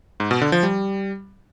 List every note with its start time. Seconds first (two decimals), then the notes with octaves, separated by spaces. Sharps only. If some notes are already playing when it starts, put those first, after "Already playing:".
0.20 G#2
0.31 B2
0.41 D3
0.52 F3
0.63 G3